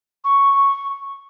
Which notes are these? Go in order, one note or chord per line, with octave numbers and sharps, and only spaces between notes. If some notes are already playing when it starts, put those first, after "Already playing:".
C#6